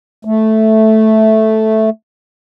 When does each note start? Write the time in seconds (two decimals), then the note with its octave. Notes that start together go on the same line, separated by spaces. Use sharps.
0.25 A3